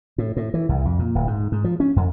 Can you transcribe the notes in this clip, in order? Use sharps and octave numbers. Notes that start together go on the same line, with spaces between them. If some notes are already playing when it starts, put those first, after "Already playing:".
A2
A2
E3
C2
F2
A#2
D1
G#2
G#2
F3
C#4
F2